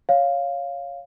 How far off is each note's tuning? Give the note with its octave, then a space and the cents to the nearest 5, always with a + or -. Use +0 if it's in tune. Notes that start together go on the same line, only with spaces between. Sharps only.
C#5 +0 F5 +0